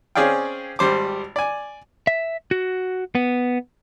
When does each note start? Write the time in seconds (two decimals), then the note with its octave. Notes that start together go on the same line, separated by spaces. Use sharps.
0.15 C4 C#4 G#4 D5 F5 G5
0.79 G#1 G3 C5 D6
1.36 D5 G#5
2.07 E5
2.51 F#4
3.15 B3